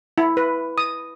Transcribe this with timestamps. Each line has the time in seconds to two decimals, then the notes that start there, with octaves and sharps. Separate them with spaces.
0.18 E4
0.37 B4
0.78 D#6